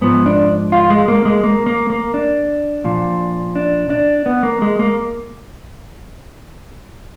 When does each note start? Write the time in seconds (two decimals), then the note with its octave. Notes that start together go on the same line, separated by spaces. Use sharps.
0.01 G#2 F3 B3
0.26 D4
0.72 F4
0.90 G#3
1.08 A#3
1.25 G#3
1.44 A#3
1.66 A#3
1.90 A#3
2.14 D4
2.84 A#2 F3
3.55 D4
3.90 D4
4.26 B3
4.43 A#3
4.62 G#3
4.79 A#3